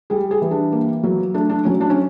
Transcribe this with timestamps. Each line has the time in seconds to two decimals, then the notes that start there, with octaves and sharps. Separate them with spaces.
0.10 G3 G#4
0.31 G#4
0.42 E3
0.51 D4
0.72 A#3
1.03 F#3
1.34 A3 D4
1.50 D4
1.65 F#3 C#4
1.81 D4
1.90 C#4